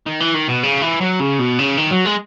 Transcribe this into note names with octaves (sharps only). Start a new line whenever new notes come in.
D#3
E3
D#3
B2
C#3
E3
F#3
C#3
B2
C#3
D#3
F#3
G#3